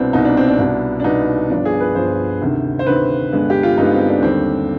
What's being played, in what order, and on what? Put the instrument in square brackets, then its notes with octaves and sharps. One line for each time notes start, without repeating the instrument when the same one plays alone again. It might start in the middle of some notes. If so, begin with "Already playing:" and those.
Already playing: [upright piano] C2 B2 B3 C4 D4
C2 B2 B3 D#4
D4
C4
D4
C2 B2 B3
D4
C2 B2 B3 D#4
G1 G2 F3 B3 D4
G#4
B4
G1 G2 F3 B3 C5
D2 C3 D#3
C5
D2 C3 D#3 B4
G2 D3 G#3 B3
G4
F4
G2 D3 G#3 B3 D#4
C4
D4
D#2 D3 G3 C4